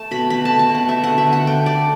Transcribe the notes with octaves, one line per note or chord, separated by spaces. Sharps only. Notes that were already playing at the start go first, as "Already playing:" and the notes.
Already playing: A3 A5
B2 B5
A3 B5
A3 A5
A5
B2
F#5
A3 E5
D3 F#5
E5
D3
F#5
A3 G5
A3 D5